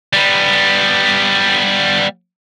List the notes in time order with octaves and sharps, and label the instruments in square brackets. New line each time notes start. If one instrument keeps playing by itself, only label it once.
[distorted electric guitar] G3 B3